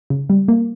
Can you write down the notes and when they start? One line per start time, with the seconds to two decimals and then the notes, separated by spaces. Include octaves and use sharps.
0.10 C#3
0.30 G3
0.48 A#3